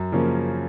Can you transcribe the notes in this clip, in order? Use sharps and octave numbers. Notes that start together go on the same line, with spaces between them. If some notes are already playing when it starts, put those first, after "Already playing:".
Already playing: F#2
C#3 F3 A#3 C#4